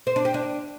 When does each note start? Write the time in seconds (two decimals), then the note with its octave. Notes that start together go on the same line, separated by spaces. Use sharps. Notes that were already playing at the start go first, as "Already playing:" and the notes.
0.07 C5
0.16 D4
0.25 G4
0.34 D4